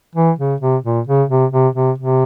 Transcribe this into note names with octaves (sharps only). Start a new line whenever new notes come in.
E3
C#3
C3
A#2
C#3
C3
C3
C3
C3